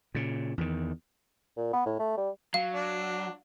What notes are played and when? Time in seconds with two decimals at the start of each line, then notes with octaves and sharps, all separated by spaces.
0.15 A#2 C#3
0.58 E2 D#3
1.57 A#2
1.73 B3
1.86 A2
1.99 A3
2.17 G3
2.54 F#3 F5
2.73 D4